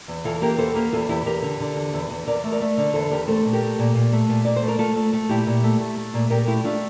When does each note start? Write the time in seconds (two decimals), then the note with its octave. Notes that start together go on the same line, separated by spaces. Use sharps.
0.08 E2
0.25 E3 F4 A4
0.42 A#3 G4 A#4
0.58 E2 A4 C5
0.75 A#3 G4 A#4
0.93 E2 F4 A4
1.09 E2 E4 G4
1.26 E2 G4 A#4
1.42 D3
1.60 D3
1.76 E2
1.93 E2
2.10 E2
2.27 E2 A#4 D5
2.44 A3
2.52 A#4 D5
2.60 A3
2.77 D3 A#4 D5
2.94 E2 A4 C5
3.11 E2 G4 A#4
3.28 A3 A4 C5
3.45 A#2
3.53 G4 A#4
3.62 A3
3.79 A#2
3.95 A#2
4.13 A3
4.29 A#2
4.45 A#2 D5
4.56 C5
4.63 A3
4.68 A#4
4.79 A3 F4 A4
4.96 A3
5.13 A3
5.29 A#2 E4 G4
5.47 A#2
5.63 A3
5.80 A3
5.97 A3
6.14 A#2
6.30 A#2 G4 A#4
6.47 A3 E4 G4
6.64 A3 D4 F4